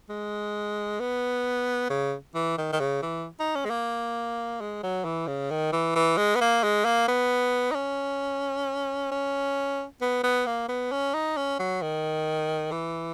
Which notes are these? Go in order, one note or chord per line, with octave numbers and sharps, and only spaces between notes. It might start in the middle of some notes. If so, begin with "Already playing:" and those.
G#3
B3
C#3
E3
D#3
D#3
C#3
E3
D#4
C#4
G#3
A#3
G#3
F#3
E3
C#3
D#3
E3
E3
G#3
B3
A#3
G#3
A#3
B3
D#4
C#4
C#4
B3
B3
A#3
B3
C#4
D#4
C#4
F#3
D#3
E3